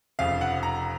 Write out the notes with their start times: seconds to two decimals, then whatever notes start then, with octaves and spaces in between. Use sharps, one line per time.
0.19 F1 F2 C#3 F5
0.41 F#5
0.63 A#5